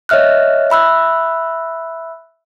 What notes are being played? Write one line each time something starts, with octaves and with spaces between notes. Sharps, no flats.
C#5 D#5 E5 F6 F#6
E5 B5 E6 F#6